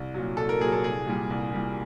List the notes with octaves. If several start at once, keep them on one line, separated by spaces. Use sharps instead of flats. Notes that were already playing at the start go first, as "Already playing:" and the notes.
Already playing: C2
A#2 F#3
C2 A4
A#4
A#2 F#3 G#4
A4
C2 G#4
A#2 G3
C2
A#2 G3